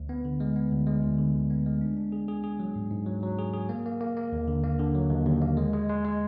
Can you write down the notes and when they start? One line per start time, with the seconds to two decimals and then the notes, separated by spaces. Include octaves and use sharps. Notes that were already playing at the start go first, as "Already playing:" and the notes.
Already playing: D2
0.09 B3
0.25 D3
0.40 G#3
0.56 B3
0.72 D2
0.87 G#3
1.03 D2
1.18 D3
1.34 D2
1.50 B3
1.66 G#3
1.81 D4
1.97 D4
2.12 G#4
2.28 G#4
2.44 G#4
2.60 F#3
2.75 G#2
2.91 G#2
3.06 F#3
3.23 F#3
3.39 G#4
3.54 G#4
3.69 A#3
3.86 A#3
4.01 A#3
4.17 A#3
4.32 D#2
4.48 D3
4.64 A#3
4.79 D3
4.95 F#3
5.10 D#2
5.26 D#2
5.42 A#3
5.57 G#3
5.73 G#3
5.89 G#3
6.05 G#3